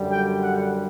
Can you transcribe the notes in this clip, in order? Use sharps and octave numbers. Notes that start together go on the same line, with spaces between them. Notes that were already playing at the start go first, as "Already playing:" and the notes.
Already playing: F#2 D3 G3
G5
F#5